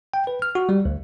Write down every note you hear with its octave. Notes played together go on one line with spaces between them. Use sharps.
G5
B4
F6
F#4
G3
D2